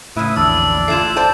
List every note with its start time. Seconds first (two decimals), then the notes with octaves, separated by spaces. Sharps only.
0.16 A2 C#3 E4 B4 E5 D#6
0.36 A#1 E2 D3 D4 D5 E6
0.88 G1 A3 E4 F4 C7 E7
1.16 C5 D5 G5 A5